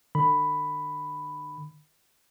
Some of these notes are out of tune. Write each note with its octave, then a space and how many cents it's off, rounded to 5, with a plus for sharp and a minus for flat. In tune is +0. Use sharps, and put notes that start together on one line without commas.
D3 +35 B5 +5